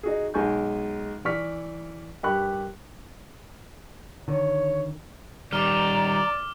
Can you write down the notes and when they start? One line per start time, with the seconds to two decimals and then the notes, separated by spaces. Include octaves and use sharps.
0.03 D#4 F#4 G#4
0.34 B1 G#3 G#5 C#6 G6
1.25 E3 D5 C#6 F6 B6
2.23 G2 G4 A#4 B5 C#6 F#6
4.28 D3 D#3 C#5
5.52 D#3 G3 D5 A#5 D6 F6